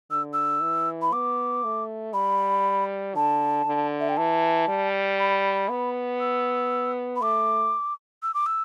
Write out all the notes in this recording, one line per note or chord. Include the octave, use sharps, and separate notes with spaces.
D3 E6
E6
E3
B5
B3 D6
A3
G3 B5
D3 A5
D3
E5
G5
E3 A5
G3
B5
B3
E6
B5
A3 D6
E6
D6
E6